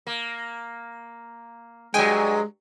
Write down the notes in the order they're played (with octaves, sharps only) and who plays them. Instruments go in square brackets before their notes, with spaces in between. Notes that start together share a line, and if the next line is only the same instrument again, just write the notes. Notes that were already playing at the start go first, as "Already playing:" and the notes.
[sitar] A#3
[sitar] G2 F#3 [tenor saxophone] G#3 [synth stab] G5 G#5